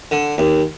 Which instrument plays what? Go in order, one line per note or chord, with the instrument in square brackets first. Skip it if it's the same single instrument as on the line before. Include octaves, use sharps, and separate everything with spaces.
[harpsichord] D3
D#2